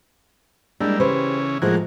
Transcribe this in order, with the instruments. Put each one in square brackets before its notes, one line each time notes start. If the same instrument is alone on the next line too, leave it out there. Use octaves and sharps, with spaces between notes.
[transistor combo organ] G3 A#3 E4 [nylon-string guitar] G#3 D4
[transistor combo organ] C#3 E3 C#4 [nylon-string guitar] G4 B4 C5
[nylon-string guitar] A2 F3 G#3 [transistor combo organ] A#3 F#4 G#4